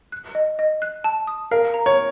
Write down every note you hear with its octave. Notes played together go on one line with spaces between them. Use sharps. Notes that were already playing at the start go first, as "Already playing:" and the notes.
F#6
D#5
D#5
F#6
A5
D#6
A#4 F5
A#5
C#5